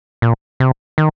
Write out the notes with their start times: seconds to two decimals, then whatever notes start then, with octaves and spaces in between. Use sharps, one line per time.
0.22 A#2
0.60 C3
0.98 D#3